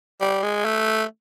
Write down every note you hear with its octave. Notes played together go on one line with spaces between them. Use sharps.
G3
G#3
A3